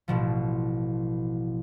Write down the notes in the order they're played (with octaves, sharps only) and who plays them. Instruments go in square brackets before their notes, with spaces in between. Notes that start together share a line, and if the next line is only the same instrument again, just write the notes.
[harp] A1 B2 F3